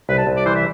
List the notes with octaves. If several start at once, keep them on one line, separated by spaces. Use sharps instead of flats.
C2 B4
A5
C2
D5
E3 C5
E5